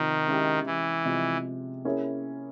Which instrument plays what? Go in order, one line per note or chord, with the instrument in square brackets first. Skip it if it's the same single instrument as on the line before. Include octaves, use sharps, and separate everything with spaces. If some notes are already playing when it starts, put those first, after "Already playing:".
Already playing: [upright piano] C3 F3 C4 [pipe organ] D#3
[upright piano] G#3 C#4 E4 G4
[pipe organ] E3
[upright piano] C3 F3 G#3
A#3 C#4 E4 G#4 C#5